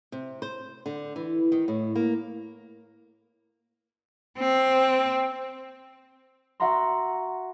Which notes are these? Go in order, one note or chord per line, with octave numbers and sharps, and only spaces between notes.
C3
C5
D3
E3
D#3
A2
A#3
C4
F#4 E5 F#5 A#5 C6